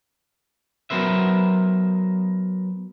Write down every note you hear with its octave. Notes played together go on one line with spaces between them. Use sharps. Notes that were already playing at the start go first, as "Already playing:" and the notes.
F#3 B3 A#4 C5 E5